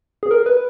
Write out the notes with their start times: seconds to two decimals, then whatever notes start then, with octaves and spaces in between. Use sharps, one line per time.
0.23 G#4
0.31 A#4
0.46 B4